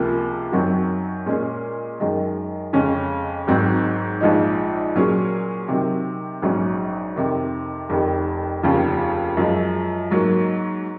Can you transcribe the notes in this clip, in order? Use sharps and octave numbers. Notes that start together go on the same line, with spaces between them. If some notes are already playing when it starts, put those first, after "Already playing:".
Already playing: C#2 C3 F3 A#3 F4
F#2 D#3 F#3 C4 F#4
A#2 G#3 C#4 G#4
F#2 D#3 G#3
F2 C#3 G#3 C#4
G#1 G#2 F#3 C4
A#1 G#2 F3 G#3 D#4
A#2 F#3 C#4 G#4
C3 D#3 F#3 C4
A#1 G#2 F#3 C#4
F2 C3 D#3
F1 F2 D#3
F1 D#2 C#3 F3
F#2 F3 G#3
G#2 F#3 A#3